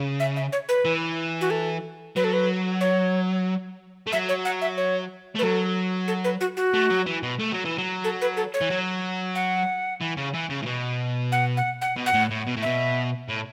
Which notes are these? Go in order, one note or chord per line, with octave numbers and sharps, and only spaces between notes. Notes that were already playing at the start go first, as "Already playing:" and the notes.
Already playing: C#3
E5
E5
C#5
B4
E3
F#4
A4
F#3 B4
A4
B4
C#5
A3
F#3 E5
C#5
F#5
E5
C#5
A3
B4
F#3 A4
A4
B4
F#4
F#4
A3
F#3
E3
B2
A3
F#3
E3
F#3
A4
B4
A4
C#5
E3
F#3
F#5
E3
C#3
E3
C#3
A2
B2
F#5
F#5
F#5
B2
F#5
A2
A2
B2
A2
B2 E5
A2